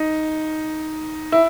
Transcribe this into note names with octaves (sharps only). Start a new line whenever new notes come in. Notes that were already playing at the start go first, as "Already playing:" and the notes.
Already playing: D#4
E4